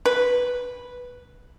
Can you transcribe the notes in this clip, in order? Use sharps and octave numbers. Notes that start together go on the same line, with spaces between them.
B4